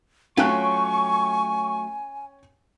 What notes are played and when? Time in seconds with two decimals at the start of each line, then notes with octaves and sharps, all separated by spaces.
0.37 F#3 A3 C#4 F4 G5 G#5 C#6 F#6